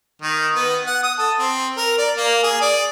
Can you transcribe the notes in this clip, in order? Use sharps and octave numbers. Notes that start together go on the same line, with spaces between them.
D#3
B3
F#5
D#6
A4
C4
A#4
D5
A#3
G#4
D5